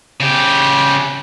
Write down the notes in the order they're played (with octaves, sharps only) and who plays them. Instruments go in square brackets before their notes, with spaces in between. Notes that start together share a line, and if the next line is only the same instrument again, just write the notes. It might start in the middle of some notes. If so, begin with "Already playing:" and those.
[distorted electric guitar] C#3 G4